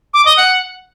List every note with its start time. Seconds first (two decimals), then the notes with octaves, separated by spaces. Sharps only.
0.14 D6
0.25 D#5
0.37 F#5